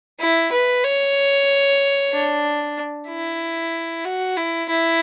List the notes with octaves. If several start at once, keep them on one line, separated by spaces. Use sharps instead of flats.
E4
B4
C#5
D4
E4
F#4
E4
E4